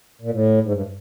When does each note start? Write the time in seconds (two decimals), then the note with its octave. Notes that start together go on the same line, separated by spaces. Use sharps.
0.22 A#2
0.31 A2
0.63 G#2
0.72 G2